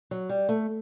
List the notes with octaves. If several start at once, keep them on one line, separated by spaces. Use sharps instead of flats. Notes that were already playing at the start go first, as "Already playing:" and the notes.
F#3
G3
A3